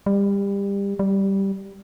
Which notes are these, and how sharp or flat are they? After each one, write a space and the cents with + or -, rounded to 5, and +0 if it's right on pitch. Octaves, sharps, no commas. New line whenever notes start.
G3 +25
G3 -5